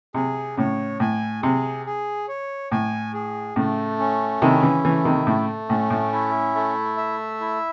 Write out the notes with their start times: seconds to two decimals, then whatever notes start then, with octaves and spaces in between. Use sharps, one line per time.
0.14 C3 G#4
0.57 A2 C#3 C#5
1.00 A2 G#5
1.42 C3 G#4
1.86 G#4
2.28 C#5
2.72 A2 G#5
3.14 G#4
3.56 A2 C#3 A3
3.99 C#4
4.41 C3 D#3 E4
4.63 C#3 E3
4.85 C#3 E3 A3
5.05 C3 D#3
5.26 A2 C#3 A3
5.70 A2 C#4
5.90 A2
6.13 E4
6.55 A3
6.97 E5
7.41 E4